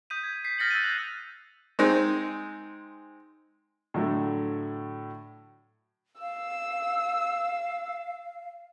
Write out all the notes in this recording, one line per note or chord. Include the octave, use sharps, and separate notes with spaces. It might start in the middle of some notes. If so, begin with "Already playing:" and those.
D#6 G6 B6 D#7
G#6
B6 C7
F6 A6 A#6 C#7 F#7
E6 F#6 D#7
F#6 G6 A6 A#6 F7 F#7
G#3 C4 D#4
A2 D3 F#3 A3
F5 E6